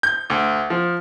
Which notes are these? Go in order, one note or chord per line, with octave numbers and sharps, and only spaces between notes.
G6
D2
F3